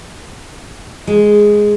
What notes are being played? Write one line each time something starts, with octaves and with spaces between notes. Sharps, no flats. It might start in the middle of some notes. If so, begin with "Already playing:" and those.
G#3